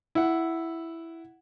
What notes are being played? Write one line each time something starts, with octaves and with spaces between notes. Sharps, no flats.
E4 F#5